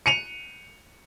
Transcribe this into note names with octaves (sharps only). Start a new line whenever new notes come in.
C#7 D#7 F7